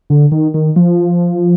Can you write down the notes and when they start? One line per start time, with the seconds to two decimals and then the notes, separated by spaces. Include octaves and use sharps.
0.10 D3
0.32 D#3
0.54 D#3
0.76 F3